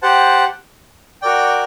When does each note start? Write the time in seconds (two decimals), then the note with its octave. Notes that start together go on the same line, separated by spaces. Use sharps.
0.02 G4 C5 F#5 A5
1.22 F#4 A#4 D5 G5